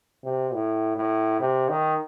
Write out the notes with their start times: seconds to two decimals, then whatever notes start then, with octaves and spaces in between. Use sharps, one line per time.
0.24 C3
0.53 A2
0.96 A2
1.40 C3
1.69 D#3